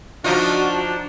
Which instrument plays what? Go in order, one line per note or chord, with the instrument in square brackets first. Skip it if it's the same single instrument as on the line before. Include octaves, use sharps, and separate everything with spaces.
[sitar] F3 D#4 F4 [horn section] D4 [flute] F#4